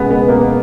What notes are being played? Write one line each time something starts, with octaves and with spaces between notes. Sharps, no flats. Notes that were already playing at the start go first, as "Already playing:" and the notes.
Already playing: C#2 B2 G#3 B3
B3
A#3